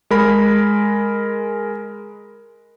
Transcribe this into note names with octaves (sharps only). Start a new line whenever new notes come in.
G#3 A#4 B5